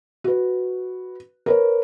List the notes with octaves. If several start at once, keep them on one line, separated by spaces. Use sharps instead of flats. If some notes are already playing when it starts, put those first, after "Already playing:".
F#4 B4
A#4 B4 C#5